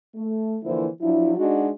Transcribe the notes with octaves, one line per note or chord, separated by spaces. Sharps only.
A3
D3 E3 F3 A#3 E4 C5
F3 F#3 D4 E4
G#3 D4 D#4 F#4